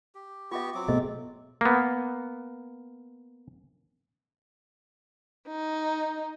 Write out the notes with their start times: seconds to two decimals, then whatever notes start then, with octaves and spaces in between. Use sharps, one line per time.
0.15 G4
0.51 B3 F4 G4 E5 C#6
0.75 F#3 C4 D6
0.88 B2 A3 G#4 C5 D#5
1.61 A#3 B3
5.48 D#4